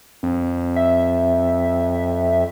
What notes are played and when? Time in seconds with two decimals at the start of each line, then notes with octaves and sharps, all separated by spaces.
0.23 F2
0.76 E5